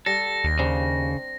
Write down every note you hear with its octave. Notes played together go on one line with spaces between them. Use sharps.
G3 A4 A#6
D#2
C#3 C4 D4 G4